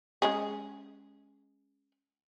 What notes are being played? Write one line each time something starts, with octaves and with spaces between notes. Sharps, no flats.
G#3 C#4 G#4